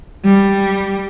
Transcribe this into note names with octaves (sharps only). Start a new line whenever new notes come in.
G3